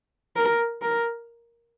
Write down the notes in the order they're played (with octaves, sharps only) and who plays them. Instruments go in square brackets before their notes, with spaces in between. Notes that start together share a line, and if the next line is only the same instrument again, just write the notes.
[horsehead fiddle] A#4
A#4